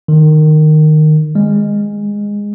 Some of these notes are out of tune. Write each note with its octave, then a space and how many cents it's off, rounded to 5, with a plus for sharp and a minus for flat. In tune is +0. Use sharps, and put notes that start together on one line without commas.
D#3 -15
G#3 -15